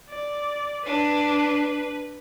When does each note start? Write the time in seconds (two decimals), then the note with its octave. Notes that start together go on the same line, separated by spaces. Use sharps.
0.10 D5
0.86 D4 B4